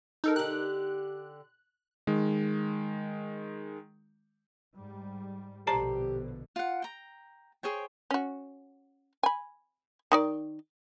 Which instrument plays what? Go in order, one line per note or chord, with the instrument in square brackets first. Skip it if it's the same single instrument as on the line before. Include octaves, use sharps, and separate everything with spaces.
[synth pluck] D#4 A4 A#4
[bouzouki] D3 G4 [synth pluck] F#6
[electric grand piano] D#3 G#3
[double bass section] G#2 G3
[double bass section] A#1 B2 D3 [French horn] G4 [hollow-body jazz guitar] C5 D5 A5 [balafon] A#5
[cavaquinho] F4 F#5
G5 A#5
G#4 C5 C#5 G5
[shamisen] C#4 F#4
G#5 B5
D#3 D#4 D5